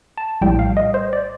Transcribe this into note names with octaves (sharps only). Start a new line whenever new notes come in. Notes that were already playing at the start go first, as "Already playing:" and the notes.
A5
A#1 A2 G3 G5
F5
D#5
C5
D5